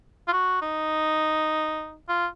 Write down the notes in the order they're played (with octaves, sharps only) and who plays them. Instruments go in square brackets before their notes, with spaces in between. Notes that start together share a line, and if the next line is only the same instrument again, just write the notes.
[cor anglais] F4
F#4
D#4
F4